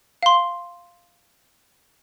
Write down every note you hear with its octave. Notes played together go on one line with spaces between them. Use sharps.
F5 C6